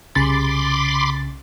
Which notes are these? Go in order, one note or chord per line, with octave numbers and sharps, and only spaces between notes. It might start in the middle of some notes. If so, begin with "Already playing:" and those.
C2 C#3 B5 C6 D6 A6